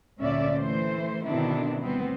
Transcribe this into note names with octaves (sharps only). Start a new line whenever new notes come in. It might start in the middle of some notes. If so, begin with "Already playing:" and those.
D2 A#2 D3 C#4 D5 E5
E3 A3 C5
B2 D3 D#3 C4 D4 E4
D2 G3 B3 C4